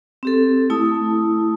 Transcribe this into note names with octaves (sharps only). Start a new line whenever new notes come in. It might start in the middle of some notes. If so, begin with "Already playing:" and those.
C4 G4 A4
A3 E4 A5 D#6